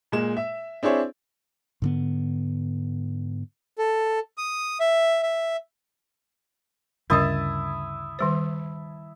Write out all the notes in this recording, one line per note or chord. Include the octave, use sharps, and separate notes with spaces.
A#2 G#3 E7
E5
C4 D4 E4 G#4 C#5
G#2 D3 B3
A4
D#6
E5
E5
D2 G2 C#3 E4 A#4 D#5 A5 D#6
D#3 G3 C5